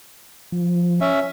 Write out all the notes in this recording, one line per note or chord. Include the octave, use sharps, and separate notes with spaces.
F3
C#4 E5